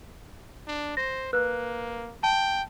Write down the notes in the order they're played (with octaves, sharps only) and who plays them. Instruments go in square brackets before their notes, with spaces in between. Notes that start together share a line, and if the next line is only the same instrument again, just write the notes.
[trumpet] D4
[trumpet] C5 [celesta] A#6
[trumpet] A#3 [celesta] B4 F#6
[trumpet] G5 [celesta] A5